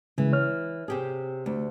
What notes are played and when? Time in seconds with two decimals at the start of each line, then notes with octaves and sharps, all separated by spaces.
0.18 C#3 E3 G#3
0.33 C#5 F6
0.88 C3 G4 G#4
1.46 D2